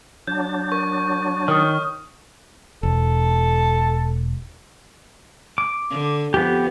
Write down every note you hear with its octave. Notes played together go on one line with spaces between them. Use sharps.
F#3 D4 G6
A#4 C#6
D#3 C#5 D#6 F6
E1 A4
D6
D3
F2 B3 G4